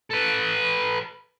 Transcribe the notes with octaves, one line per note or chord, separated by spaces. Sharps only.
A4 B4